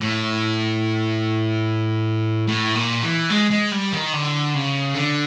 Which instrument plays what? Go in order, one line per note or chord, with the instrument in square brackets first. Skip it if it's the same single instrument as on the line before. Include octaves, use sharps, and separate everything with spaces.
[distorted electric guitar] A2
A2
A#2
E3
G#3
G#3
G3
D#3
D3
C#3
D3